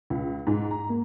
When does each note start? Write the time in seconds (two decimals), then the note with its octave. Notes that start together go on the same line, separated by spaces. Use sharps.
0.10 C#2
0.47 G#2
0.71 A#5
0.89 A#3